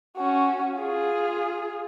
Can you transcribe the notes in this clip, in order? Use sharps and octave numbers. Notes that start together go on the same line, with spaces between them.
C#4 F#4
F4 G#4